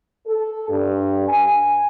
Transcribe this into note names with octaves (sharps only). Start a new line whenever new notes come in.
A4
G2
G#5